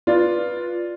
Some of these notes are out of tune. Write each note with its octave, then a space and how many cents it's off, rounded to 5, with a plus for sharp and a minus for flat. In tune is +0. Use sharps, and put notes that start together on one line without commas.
F4 +0 B4 -15 D5 +0